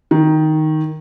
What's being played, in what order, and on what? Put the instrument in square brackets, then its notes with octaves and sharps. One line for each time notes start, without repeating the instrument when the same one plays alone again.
[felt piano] D#3